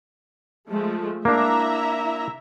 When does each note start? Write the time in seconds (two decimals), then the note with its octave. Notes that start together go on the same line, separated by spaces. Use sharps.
0.70 F3 G#3 A3
1.25 A#3 D4 E4 E5 A#5